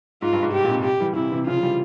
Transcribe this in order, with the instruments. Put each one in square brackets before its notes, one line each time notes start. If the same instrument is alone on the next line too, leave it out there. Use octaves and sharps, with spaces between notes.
[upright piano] G#2 [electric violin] F4
[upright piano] G2
G#2
[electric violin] G4
[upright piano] A#2
G#2 C3
[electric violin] G4
[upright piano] E3 G3
[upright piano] C3 E3 [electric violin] E4
[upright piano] C3 E3
[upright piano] C#3 F3 [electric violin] F4
[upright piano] F3
E3 G3